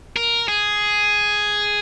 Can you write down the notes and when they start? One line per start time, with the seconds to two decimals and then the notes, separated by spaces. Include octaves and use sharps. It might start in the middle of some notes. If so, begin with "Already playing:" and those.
0.16 A#4
0.48 G#4